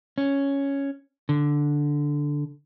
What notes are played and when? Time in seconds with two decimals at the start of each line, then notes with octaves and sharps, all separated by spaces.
0.18 C#4
1.29 D3